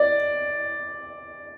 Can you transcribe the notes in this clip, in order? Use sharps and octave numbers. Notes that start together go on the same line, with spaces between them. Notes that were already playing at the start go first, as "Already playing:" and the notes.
Already playing: D5